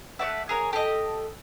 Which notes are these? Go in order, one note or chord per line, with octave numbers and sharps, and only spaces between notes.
A3 D5 E5 F#5
G#4 A#4 C#5
G4 A4 D#5